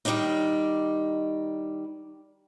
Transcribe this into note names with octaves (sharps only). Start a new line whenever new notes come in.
D#3 G3 A#3 D4 D#4